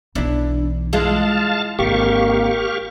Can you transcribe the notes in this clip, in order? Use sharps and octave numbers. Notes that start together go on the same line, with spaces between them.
B1 E3 D4 E4
G#3 E4 F4 F5 A5
G#1 D3 A#3 G4 F5 C#6